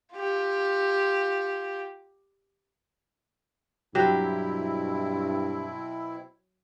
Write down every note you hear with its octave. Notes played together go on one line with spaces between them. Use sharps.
F4 G4
G2 B2 F#3 C4 E4 G4